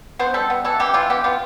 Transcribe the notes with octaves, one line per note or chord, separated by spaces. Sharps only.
B3 C5
G3 A4
B3
E3 A4
E3 G4
E3 F4
B3 G4
B3 F4